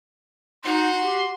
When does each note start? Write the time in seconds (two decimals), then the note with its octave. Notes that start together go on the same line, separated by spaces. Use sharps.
0.65 D#4 F#4 C6
1.02 G4